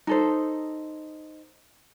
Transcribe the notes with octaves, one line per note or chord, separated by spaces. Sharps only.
D#4 A4 C5